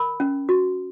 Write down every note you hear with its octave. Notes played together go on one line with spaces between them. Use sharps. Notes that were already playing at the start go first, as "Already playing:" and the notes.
Already playing: A#4 B5
C#4
F#4